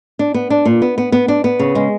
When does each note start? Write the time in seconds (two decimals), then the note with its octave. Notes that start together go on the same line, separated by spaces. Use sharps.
0.19 D4
0.34 B3
0.50 D4
0.65 A#2
0.82 B3
0.98 B3
1.12 B3
1.28 D4
1.44 B3
1.59 C#3
1.75 G#3